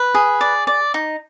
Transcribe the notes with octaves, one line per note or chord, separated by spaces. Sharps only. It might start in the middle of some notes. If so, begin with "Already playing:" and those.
Already playing: B4
G#4
D5
D5
D#4